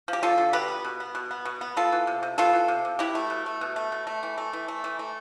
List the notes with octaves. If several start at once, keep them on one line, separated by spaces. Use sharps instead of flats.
F3
G4
D3 F4 A4
D3
B2 G4 B4
B3
B2
B3
B2
B3
B2
B3
B3 F4 A4
E3
C3
C3
B3 F4 A4
E3
C3
C3
B2 E4 G4
A3
B2
A3
B2
A3
B2
A3
E3
A3
E3
A3
E3
A3